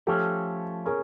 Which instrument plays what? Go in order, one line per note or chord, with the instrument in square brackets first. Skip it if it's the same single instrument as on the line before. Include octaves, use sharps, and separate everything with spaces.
[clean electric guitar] F3 A3 C#4 [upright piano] G4 A4
[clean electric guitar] C#4 [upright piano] G#4 A#4